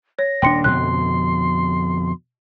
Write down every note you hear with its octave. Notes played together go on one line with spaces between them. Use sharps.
C#5 A#6
D#1 D4 G5 C6 C#7
F2 B2 D3 C6 F#6